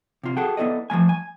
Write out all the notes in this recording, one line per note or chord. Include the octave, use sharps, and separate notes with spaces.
C3 F4
F#4 G#4 A4 F#5 G5
B3 E4 F4 A4 D5 D#5
F3 G#3 A3 G#5
G#5